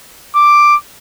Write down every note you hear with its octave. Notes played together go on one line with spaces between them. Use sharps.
D6